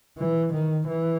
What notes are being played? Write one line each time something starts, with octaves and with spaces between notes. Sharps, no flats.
E3
D#3
E3